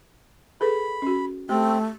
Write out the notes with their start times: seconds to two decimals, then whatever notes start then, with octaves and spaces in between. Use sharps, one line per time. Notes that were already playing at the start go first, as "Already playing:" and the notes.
0.61 G#4 A4 B4 B5
1.02 C#4 F#4
1.49 A3 C4 G4